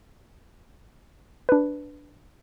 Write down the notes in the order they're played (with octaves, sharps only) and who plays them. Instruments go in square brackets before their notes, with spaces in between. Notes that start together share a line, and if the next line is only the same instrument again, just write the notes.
[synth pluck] D4 B4